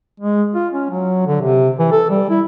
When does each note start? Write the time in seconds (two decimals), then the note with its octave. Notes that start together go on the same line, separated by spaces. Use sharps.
0.20 G#3
0.55 F4
0.73 C#4
0.90 F#3
1.27 D3
1.42 C3
1.79 E3
1.92 A4
2.10 G3
2.30 E4